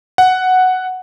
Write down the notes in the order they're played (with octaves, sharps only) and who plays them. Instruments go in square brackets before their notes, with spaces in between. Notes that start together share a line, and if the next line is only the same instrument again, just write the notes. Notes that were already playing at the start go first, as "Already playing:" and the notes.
[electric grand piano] F#5